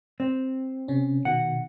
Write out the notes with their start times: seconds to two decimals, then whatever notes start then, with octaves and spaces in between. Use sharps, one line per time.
0.20 C4
0.88 C3 C#4
1.25 B2 D#3 F#5